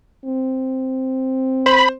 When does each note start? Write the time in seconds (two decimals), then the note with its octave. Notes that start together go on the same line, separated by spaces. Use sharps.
0.24 C4
1.66 C5 B5